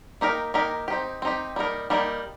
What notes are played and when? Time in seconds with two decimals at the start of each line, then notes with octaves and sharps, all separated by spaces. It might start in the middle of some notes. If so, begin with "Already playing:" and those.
0.21 A#3 D#4 G4 A#4
0.54 A#3 D#4 G4 A#4
0.88 C4 D#4 G4
1.22 C4 D#4 G4
1.56 G3 A#3 D#4 A#4
1.90 G3 A#3 D#4 A#4